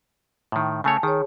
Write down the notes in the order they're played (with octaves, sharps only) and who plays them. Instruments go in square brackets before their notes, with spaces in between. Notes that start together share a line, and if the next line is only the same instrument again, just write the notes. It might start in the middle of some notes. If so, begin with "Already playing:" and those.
[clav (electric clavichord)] A2 D#3
[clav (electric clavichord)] C#3 A3 C#5 [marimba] G#5 A5
[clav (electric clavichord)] D#3 [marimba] G#4 C#5